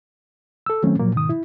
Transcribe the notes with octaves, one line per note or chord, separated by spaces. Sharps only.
A4 E6
D#3 F#3 A3 C4 C#4
A#2 F3 F#3 A#3
G#2 B2 D#3 D#6
E4